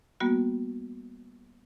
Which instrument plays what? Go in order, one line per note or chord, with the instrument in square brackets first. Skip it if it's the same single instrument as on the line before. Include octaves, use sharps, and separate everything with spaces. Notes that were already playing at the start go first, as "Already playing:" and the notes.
[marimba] G3 A#3 B3 F#4